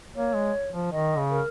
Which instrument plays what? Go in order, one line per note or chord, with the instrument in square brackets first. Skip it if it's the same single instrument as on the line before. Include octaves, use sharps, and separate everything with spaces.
[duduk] A#3 [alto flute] C#5
[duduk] G#3
F3
[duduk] D#3 [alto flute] D#5
[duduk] C#3
[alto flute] A#4